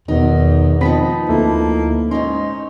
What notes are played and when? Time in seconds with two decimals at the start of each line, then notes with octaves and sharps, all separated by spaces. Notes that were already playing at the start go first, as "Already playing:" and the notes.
0.08 E2 B2 D#3 B3 D#4
0.81 F3 B3 C4 D#4 B5 B6
1.29 D2 A#3 E4 A4
2.11 G#2 C#4 D#4 C6